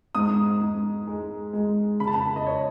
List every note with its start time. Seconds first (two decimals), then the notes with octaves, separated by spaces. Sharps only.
0.15 G#2 D#6
0.61 G#2
1.07 G#3
1.53 G#3
2.00 C#3 B5
2.07 A5
2.14 B5
2.36 D#5
2.46 C#5